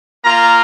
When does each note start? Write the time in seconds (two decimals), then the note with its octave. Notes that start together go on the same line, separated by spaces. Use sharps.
0.23 A#3 F4 A#5